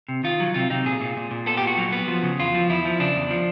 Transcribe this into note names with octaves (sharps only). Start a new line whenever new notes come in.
C3
D#3 F4
F#3
C3 F4
C3 D#4
A#2 G#4
A#2
A#2
A#2
B3 A4
A#2 G4
F#4
F#3
B3
F3
C#3
E2 F4
F3
E2 E4
F3
C#3 D4
E2
F3